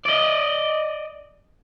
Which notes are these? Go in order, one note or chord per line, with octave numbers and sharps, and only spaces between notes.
D5 D#5